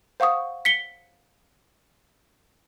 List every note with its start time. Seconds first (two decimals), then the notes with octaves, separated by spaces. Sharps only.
0.20 C5 F5 F#5 C#6 D#6
0.65 B6 C#7 G7